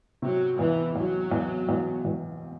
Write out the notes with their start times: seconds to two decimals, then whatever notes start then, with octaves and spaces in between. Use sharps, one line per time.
0.22 C3 F#3
0.59 E2 E3
0.95 E2 F#3
1.31 E2
1.69 E2
2.05 E2